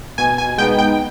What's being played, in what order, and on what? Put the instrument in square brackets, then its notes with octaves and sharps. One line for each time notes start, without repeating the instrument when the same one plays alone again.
[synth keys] B2 G#5
G#5
G#3 B3 D#4 G5
G5